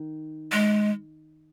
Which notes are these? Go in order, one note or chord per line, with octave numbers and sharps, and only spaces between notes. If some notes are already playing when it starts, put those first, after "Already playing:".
Already playing: D#3
G#3